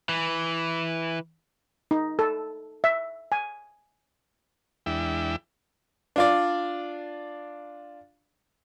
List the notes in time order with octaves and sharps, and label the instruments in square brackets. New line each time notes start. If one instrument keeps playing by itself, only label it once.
[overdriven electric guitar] E3
[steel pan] D#4
A4
E5
G#5
[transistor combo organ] E2 G#3 D4 E4 E5 G5
[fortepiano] D4 F4 D5